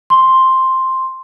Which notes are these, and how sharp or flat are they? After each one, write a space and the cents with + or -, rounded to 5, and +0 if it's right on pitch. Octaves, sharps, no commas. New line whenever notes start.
C6 +5